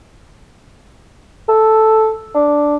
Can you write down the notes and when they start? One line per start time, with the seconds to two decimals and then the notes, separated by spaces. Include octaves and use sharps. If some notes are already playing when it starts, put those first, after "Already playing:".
1.49 A4
2.34 D4